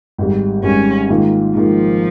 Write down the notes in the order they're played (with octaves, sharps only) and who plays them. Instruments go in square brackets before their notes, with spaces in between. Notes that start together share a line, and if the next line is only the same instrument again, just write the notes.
[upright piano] G#1 G#2 G3
[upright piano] G#1 G#2 G3 [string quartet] C#4
[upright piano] G#2 D#3 A#3 F4
[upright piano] G#2 D#3 A#3 F4 [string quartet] F3